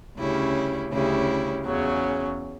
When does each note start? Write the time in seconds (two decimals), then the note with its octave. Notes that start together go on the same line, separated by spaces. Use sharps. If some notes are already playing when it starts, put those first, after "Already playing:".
0.18 D2 C#3 G3 C#4 E4
0.92 D2 C#3 G3 C#4 E4
1.65 E2 C#3 F#3 C#4